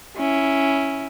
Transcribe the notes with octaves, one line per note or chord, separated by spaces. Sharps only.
C#4 E4